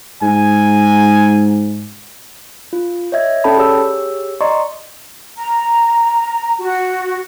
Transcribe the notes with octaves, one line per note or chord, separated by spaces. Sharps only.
G#2 G#5
F4
C#5 D#5 E5 G#6
C#4 A4 D5 G5 A5 B5
G4 G#4 C#5 E6
D5 D#5 A#5 C6 C#6
A#5
F#4